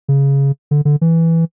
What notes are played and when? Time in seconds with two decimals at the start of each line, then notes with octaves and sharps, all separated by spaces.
0.08 C#3
0.71 D3
0.85 D3
1.01 E3